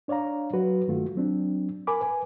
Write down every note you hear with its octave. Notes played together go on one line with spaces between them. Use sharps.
D4 C#5 D5 F5 A#5
F#3 F#4 B4
G2 D#3 A3 F4 F#4
F#3 C4 D4
A#4 G#5 B5 D6
B4 G#5